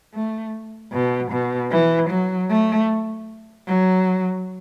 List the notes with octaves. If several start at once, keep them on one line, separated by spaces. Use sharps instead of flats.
A3
B2
B2
E3
F#3
A3
F#3